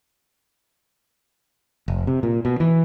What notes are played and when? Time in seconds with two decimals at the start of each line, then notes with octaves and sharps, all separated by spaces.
1.88 F1
2.07 C3
2.23 A#2
2.45 B2
2.60 E3